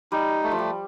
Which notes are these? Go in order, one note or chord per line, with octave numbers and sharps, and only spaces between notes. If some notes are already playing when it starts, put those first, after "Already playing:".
G3 D#4
A3
F3
G3